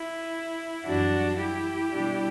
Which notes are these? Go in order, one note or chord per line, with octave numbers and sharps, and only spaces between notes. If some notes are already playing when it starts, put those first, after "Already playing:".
Already playing: E4
F#2 E3 G3 D4 F#4
E4 G4
B2 G3 D4